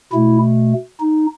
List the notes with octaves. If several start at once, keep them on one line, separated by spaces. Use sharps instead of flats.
B2 A3 E4
D#4